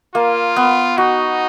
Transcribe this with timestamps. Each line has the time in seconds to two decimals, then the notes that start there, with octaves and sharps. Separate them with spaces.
0.14 A#3 F4
0.56 B3
0.98 D#4 F#4